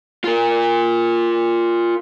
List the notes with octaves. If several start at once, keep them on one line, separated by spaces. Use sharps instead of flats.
F4 A#4